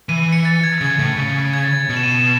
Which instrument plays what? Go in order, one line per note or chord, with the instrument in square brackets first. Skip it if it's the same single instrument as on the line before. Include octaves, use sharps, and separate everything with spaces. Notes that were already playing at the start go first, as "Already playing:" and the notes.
[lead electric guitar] E3 [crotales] D#7
[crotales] C#7
A6
G#6
[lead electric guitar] C#3 [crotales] G#6
[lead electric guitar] A2
C#3
[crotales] G#6
A6
G#6
[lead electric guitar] B2
[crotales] E7
D#7
E7